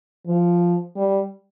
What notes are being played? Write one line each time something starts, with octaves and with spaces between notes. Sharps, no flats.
F3
G3